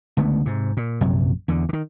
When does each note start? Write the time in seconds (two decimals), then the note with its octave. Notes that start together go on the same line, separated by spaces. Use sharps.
0.17 C#2 D3 A3 B3
0.46 G#2 C3
0.77 A#2
1.01 A#1 F#2 C3 F#3
1.48 E2 D3
1.69 D3 D#3